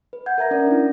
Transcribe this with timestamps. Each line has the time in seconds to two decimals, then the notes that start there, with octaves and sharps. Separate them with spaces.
0.13 B4
0.26 F#5 G6 G#6
0.38 A#4 E5 A#5 A#6
0.51 C#4 D5
0.67 D4 E4